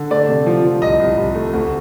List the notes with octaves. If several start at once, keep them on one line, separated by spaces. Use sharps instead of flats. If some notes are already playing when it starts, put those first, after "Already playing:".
Already playing: D3
A3 D5
C3
F3
F3
C2 D#5
C2
C2
A3
D2